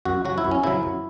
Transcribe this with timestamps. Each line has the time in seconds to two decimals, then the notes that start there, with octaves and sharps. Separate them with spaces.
0.05 F#2 F#4
0.25 C#3 F#3 F#4
0.38 E4
0.45 F#2
0.51 C#4
0.63 C#3 F#3 E4
0.83 F#2